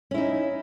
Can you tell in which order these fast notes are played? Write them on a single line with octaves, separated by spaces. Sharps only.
C#4 E4 D#4